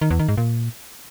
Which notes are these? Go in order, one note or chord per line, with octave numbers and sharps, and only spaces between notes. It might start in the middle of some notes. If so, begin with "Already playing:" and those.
D#3
E2
D#3
G#2
A#2